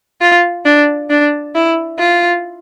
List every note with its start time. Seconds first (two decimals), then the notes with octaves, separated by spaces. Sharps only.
0.21 F4
0.65 D4
1.10 D4
1.55 E4
1.99 F4